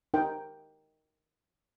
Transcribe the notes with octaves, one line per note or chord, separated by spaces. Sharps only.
D#4 A#4 G5